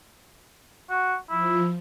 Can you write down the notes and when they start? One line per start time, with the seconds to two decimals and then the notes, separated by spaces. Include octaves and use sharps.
0.90 F#4
1.30 F3 E4